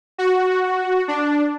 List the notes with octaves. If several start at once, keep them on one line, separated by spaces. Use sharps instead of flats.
F#4
D4